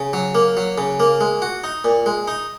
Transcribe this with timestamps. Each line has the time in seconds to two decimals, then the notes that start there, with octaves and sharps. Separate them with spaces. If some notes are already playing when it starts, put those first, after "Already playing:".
Already playing: C#3
0.13 F#3
0.35 A#3
0.57 F#3
0.78 C#3
1.00 A#3
1.21 G#3
1.42 F#4
1.64 D#4
1.84 A#2
2.06 G#3
2.28 D#4